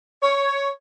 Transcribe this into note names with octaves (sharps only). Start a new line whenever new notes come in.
C#5